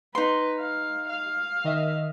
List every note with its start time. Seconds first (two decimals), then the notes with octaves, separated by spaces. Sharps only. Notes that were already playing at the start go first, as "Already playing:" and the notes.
0.15 D#4 B4 C6
0.59 F5
1.09 F5
1.64 D#3 D#5 E5